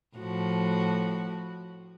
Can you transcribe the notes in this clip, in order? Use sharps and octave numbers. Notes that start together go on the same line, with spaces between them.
A2 F3 F#4